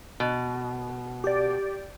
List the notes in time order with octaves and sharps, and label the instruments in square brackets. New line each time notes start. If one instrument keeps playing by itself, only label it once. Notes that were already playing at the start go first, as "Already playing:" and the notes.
[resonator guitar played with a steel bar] B2
[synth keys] G4 D5